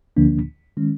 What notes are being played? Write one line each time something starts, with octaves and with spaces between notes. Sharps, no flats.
D2 D3 F3 A#3 D4
D#3 G#3 C#4